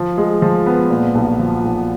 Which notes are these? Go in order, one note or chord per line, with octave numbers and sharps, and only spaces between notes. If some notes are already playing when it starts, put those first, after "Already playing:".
Already playing: F3
G#3
F3
B3
A#2
B1
F3
B1